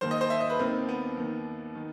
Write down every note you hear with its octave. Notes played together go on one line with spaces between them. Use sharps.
D#2 D#3 C5
D#5
C5
E5
D#5
B4
D#2 D#3 C4
B3
D#2 D#3
D#3